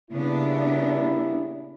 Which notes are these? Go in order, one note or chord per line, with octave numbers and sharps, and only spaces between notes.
A#2 C#3 G3 B3 D4 E4